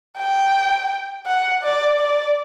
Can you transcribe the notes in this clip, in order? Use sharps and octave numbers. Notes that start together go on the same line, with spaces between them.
G5
F#5
D5
D5